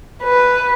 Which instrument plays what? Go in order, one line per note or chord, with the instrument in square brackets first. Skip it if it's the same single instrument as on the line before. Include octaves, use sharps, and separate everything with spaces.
[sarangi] B4